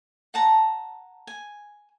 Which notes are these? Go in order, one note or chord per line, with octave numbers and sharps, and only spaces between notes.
F#5 A5 A#5
G#5